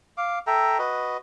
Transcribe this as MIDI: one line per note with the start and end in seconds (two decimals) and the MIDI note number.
0.17 0.39 77
0.17 0.39 86
0.47 0.78 69
0.47 0.78 76
0.47 0.78 79
0.47 0.78 82
0.79 1.17 66
0.79 1.17 71
0.79 1.17 75